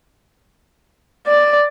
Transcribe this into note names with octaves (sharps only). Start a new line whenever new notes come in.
D5